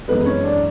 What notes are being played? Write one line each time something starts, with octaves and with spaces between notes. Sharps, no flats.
F#2 E3 G#3 B3 B4
C#4 C#5
D4 D5